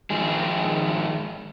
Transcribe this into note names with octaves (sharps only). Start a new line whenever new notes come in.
D#3 F3 G#3 G#4